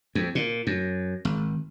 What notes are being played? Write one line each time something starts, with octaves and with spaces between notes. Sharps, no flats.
F2
A#2
F#2
G#1